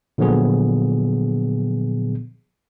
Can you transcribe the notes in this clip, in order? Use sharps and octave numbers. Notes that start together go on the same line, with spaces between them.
A#2 D3 F3 F#3 B3 G#4